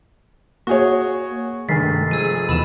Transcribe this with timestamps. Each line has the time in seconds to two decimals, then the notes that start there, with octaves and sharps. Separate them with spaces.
0.67 A#3 F#4 G#4 C#5 C#6
1.69 F1 G2 D#3 G#3 G#5 A6 B6 C7
2.11 F3 G#4 E6 D#7
2.49 D#2 B2 E3 B5 E6 E7